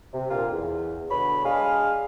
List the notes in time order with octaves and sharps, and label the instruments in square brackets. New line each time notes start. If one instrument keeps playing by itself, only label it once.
[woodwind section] C3
A#2 D3 A#3 F4 F5
E2
B2 D3 C#5 B5
G#3 D4 G#4 F5